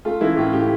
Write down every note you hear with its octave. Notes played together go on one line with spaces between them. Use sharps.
A3 F4
E3 E4
A2 F4
A2 G4